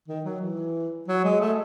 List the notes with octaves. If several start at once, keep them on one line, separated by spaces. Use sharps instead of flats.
D#3
F#3
E3
F#3
G#3
A3